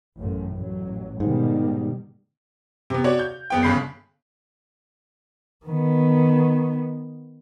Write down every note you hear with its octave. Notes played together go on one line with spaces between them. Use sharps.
A1 F#2 A2
A1 F#3
G#2 B2 D#3 G3
C3 B3
F#4 C#5 D5
G6
F#1 B3 G5
G1 C#3 B5 G6 C7
D#3 B3